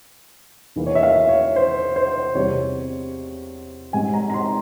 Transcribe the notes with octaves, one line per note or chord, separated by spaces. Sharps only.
E2 E3 A#3
C#5
E5
F5
C#5
C5
C5
E2 C3 G3 C4 C#5
G#2 G3 C4 G#5
A#5
A#5
C6